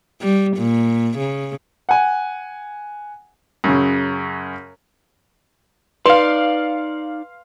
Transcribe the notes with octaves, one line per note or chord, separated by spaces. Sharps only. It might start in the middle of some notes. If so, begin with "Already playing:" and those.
G3
A#2
C#3
F#5 G#5
F#2 C#3
D#4 B4 D5 F5 C6